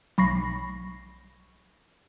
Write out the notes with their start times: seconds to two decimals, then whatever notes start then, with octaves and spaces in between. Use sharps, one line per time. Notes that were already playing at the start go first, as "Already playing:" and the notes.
0.18 B1 B5 C#6 A#6 C7